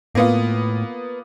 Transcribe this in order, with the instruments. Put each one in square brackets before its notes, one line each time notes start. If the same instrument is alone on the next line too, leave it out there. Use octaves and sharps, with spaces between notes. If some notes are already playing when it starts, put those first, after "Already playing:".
[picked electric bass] A2 [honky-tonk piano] A#3 B3 F4